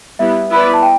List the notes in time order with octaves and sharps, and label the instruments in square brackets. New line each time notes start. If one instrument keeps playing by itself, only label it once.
[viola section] G3 B3 E4 [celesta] E5
[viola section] B3 E4 B4 D5
[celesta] A5
G5